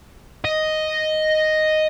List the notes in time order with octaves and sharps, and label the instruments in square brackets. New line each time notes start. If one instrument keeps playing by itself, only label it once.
[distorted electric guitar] D#5